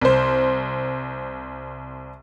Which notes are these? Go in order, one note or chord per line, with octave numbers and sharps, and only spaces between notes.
C2 C5